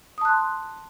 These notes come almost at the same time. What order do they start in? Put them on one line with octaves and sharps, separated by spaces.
D#6 A5 F#6 C6